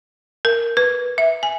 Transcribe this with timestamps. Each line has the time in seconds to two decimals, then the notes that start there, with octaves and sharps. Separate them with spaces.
0.45 A#4
0.77 B4
1.18 E5
1.43 G#5